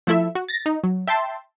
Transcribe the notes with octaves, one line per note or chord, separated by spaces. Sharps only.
F3 A3 E4 A4 E5
F#4
A6 A#6
D#4
F#3
E5 G5 A5 C6